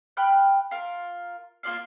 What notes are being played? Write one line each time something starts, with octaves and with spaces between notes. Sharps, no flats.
G5 B5 F6 F#6
F4 A#4
A#3 F4 D5 F5